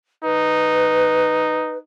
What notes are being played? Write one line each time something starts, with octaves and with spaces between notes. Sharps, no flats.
D#4 B4